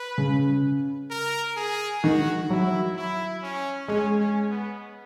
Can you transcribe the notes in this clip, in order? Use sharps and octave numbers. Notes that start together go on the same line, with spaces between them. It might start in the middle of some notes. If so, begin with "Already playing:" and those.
Already playing: B4
C#3
A#4
G#4
D#3 F#4
F#3 E4
E4
C#4
G#3 C#4
C#4
B3